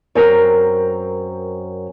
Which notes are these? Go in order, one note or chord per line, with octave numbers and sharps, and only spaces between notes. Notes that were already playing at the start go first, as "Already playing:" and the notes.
F#2 C4 A#4